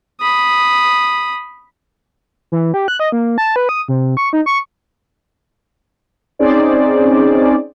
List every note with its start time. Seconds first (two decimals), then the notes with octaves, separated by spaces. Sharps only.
0.20 B5 D#6
2.52 E3
2.74 G4
2.88 F#6
3.00 D#5
3.12 A#3
3.38 A5
3.56 B4
3.69 D#6
3.88 C3
4.17 C#6
4.33 D#4
4.46 C#6
6.39 C4 C#4 D#4 G#4 C5 D5